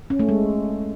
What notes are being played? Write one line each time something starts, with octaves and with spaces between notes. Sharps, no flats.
C#4
A3
G#3